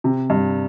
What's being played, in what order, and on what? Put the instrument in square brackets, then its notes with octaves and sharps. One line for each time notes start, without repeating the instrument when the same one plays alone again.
[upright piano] C3
G2